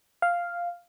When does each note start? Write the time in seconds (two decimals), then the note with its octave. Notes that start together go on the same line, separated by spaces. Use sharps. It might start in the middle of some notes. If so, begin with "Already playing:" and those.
0.22 F5